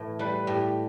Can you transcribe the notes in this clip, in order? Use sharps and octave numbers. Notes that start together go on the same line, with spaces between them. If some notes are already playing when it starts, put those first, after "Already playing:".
Already playing: A2 E3
G3 B4
A2 G4